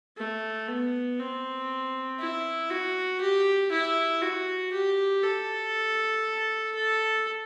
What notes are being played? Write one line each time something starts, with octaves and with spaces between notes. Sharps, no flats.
A3
B3
C4
E4
F#4
G4
E4
F#4
G4
A4
A4